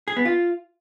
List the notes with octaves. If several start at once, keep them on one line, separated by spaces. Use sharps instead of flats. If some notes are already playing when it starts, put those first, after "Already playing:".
G#4
B3
F4